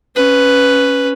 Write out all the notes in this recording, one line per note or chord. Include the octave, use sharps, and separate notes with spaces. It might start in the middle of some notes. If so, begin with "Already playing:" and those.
C#4 B4